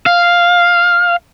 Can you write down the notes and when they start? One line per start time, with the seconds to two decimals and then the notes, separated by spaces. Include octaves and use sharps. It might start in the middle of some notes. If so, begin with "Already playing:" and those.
0.06 F5